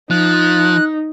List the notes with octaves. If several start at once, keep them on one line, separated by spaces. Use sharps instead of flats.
F3 D#4 F#6